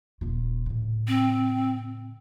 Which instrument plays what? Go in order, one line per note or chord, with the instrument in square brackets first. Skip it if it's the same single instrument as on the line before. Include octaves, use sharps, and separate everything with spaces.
[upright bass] D#1 F4
A2 C#3
[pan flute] C4